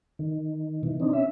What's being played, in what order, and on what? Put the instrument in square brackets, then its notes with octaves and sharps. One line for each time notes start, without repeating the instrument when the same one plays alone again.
[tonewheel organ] D#3
B2 D#3 E3
C4 D4 D#4
C#4 E5